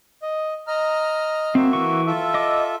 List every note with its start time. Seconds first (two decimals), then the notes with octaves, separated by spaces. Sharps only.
0.22 D#5
0.67 D#5 A#5 F6
1.55 A#3 C4 F#4 E5
1.73 E3 C#6
2.06 F4 A4 E5
2.34 D#5 D6